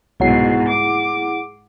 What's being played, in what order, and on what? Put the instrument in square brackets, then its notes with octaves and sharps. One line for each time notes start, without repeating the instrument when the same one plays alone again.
[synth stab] C2 F#3 C7 [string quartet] G#2 B2 [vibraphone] E4 G#4 F#5
[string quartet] D6